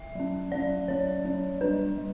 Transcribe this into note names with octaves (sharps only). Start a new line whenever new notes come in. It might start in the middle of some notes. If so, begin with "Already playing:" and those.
Already playing: E5
F#3 C#4
F#3 C#4 D5
F#3 C#4 C#5
F#3 C#4
G3 D4 B4
G3